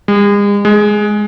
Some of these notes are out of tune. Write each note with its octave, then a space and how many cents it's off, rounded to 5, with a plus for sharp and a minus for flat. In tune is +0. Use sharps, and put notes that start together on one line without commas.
G#3 -40
G#3 +5